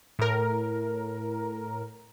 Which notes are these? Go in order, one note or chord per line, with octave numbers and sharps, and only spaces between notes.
A2 A#4